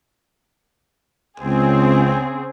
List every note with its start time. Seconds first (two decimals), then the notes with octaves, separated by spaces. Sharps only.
1.40 C#2 C#3 C4 G#4